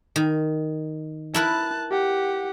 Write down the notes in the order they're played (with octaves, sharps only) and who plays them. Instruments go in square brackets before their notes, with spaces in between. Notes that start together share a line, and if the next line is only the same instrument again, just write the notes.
[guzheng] D#3
[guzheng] E4 A#4 B4 [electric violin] A5 F#6
[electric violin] G4 F#5